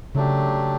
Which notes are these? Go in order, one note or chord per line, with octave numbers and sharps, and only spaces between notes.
C#3 F#3 A3 D4 G4